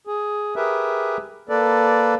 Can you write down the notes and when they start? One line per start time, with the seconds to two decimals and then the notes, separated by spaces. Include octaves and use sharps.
0.07 G#4
0.56 G4 G#4 A#4 B4 E5
1.49 A#3 A4 B4 D5